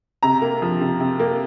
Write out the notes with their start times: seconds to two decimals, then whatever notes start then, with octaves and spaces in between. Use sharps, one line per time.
0.23 C3 A#5
0.42 A#3
0.62 F3
0.81 C3
1.00 C3
1.20 A#3